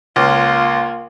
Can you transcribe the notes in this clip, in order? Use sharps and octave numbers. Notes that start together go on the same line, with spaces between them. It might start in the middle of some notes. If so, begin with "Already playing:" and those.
C#2 A#3 F4